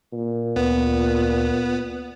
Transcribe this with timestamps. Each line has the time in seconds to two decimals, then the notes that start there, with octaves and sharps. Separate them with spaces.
0.13 A#2
0.56 D2 B3